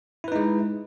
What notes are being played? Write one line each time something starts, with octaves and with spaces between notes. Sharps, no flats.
G#3 D#4 E4 B4